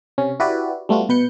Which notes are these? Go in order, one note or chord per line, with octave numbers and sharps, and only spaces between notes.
C3 C#4
E4 F#4 G4 B4 D5
G3 A3 B3 F4 F#4
B2 B4 G6 C#7